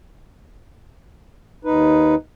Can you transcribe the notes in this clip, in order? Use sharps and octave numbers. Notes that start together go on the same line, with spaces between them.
D#2 D#4 B4